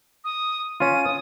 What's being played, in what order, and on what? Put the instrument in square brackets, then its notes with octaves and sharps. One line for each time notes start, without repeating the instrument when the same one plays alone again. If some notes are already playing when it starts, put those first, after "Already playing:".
[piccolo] D#6
[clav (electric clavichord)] C#4 F4 [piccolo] D#7
[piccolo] D#6